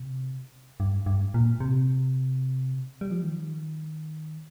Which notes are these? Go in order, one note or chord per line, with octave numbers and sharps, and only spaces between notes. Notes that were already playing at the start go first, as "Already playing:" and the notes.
Already playing: C3
G2
G2
A#2
C3
G3
F3
D#3